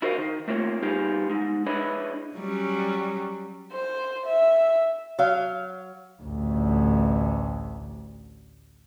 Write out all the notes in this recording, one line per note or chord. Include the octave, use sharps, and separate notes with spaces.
E4 F#4 A#4 C5 D#5 F5
D#3
A3 A#3 C4 F4 C#5
G3 B3 D#4 F4 G4 G#4
G#3 D#4
D4 E4 G#4 B4 C#5 D#5
F#3 G3 C#4
C5
E5
F#3 F5
A1 D2